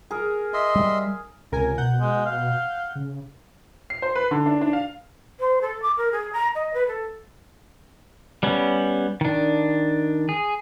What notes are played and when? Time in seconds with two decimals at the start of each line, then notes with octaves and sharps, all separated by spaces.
0.11 G#4 A#4
0.54 D#5 E5 C6
0.76 G3
1.52 C#2 C3 A#4 G#5
1.78 B2 F#5 G6
2.00 G#3
2.25 F5
2.95 C#3
3.90 C7
4.02 C5
4.15 B4
4.31 D3
4.46 D4
4.61 D4
4.73 F5
5.40 C5
5.61 A4
5.82 D6
5.97 A#4
6.11 G#4
6.33 A#5
6.55 D#5
6.73 B4
6.87 A4
8.43 G3 B3 C#4
9.21 D#3 D4
10.29 G#4